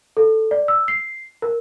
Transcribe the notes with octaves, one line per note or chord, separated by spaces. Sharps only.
A4
D5
E6
C7
A#4